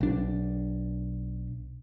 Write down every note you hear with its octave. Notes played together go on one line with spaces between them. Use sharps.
B1 D4